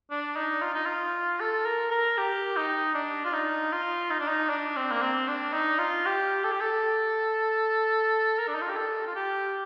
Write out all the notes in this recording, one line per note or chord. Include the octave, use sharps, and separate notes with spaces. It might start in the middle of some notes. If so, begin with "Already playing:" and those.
D4
D#4
F4
D#4
F4
A4
A#4
A#4
G4
D#4
D4
F4
D#4
F4
D#4
D4
D#4
D4
C4
A#3
C4
D4
D#4
F4
G4
A4
G4
A4
A#4
D4
D#4
F4
G4
A4
F4
G4